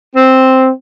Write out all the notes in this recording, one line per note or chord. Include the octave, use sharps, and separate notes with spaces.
C4